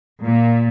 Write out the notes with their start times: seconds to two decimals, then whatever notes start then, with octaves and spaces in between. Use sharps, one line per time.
0.21 A#2